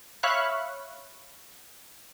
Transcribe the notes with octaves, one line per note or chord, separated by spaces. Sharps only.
C#5 E5 F5 B5 C#6 F#6